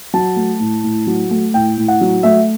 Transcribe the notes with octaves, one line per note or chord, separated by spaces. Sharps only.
F#3 A5
A3
A2
A2
F#3
A3
A2 G5
A2
F#5
F#3
A3 E5